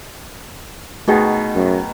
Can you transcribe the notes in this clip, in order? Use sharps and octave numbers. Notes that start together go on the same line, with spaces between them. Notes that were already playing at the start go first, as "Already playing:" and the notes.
B2 D#3 A3 F#4 G#4
F#2